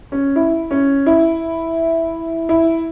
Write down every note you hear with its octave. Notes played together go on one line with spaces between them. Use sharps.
C#4
E4
C#4
E4
E4